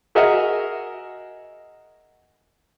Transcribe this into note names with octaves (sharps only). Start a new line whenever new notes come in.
F#4 G#4 A#4 D#5 E5 F#5